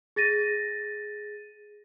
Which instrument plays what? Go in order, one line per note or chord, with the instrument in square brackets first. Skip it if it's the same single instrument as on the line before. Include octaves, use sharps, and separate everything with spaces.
[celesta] G#4 A6 A#6 D#7